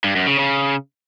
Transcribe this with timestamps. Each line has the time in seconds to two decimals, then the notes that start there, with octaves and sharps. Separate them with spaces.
0.04 G2
0.16 F#2
0.27 C#3
0.39 C#3